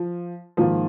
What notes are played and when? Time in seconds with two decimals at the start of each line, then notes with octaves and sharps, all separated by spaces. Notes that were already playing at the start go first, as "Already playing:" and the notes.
Already playing: F3
0.57 G#2 D#3 F3 A#3 F4